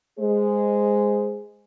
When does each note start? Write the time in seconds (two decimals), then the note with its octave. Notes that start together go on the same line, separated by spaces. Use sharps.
0.19 G#3 G#4 C5